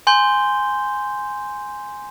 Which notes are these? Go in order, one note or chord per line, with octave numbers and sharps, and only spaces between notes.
G#5 C6 G6 G7